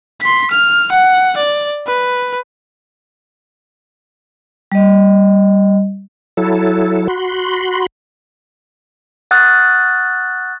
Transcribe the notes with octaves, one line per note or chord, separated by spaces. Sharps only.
C6 B6
F6
F#5
D5
B4
G3 D#5
F#3 E4 A4
F#4 B5 C6
F#5 C#6 D#6 F6 F#6 A6